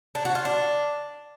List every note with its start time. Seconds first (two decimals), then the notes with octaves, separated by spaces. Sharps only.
0.15 D4
0.25 F#4
0.35 F4
0.45 D4